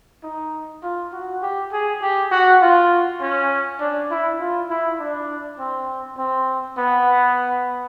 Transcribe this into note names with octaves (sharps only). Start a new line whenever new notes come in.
D#4
F4
F#4
G4
G#4
G4
F#4
F4
C#4
D4
E4
F4
E4
D4
C4
C4
B3